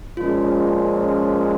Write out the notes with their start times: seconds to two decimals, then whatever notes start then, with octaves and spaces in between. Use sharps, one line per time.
0.17 A#2 F3 G#3 C#4 F4